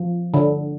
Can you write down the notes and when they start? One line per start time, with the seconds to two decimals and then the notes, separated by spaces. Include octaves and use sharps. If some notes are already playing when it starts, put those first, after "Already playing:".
Already playing: F3
0.34 D3